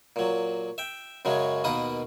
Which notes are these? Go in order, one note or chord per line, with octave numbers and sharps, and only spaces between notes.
A#2 F#3
E5 G5
F#2 C#3 F#3 G#3
D#2 B2 A#3 B4 D#6